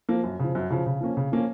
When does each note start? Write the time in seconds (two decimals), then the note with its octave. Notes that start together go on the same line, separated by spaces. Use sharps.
0.09 F3 A#3
0.24 F#2
0.39 C#3 F3
0.55 F#2
0.70 C#3 F3
0.86 C#3
1.01 F3 A#3 C#4
1.17 C#3
1.32 F3 A#3 C#4